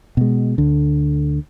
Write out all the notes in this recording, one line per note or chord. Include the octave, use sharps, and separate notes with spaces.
B2 G#3
D2 D3